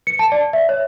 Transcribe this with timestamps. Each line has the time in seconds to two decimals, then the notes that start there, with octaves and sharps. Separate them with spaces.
0.07 C#7
0.19 A5
0.32 D5
0.53 E5
0.69 C#5